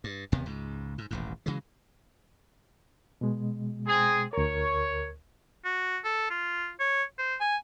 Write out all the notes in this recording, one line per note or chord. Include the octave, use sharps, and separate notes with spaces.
G2
E1 D#2 C3 B3
C#2 G#2
G#2
D#1 A1 G#2
C#3 E3 F#3 G#3
B2 G#3
C4 G#4
D2 A#4 C#5
F#4
A4
F4
C#5
C5
G#5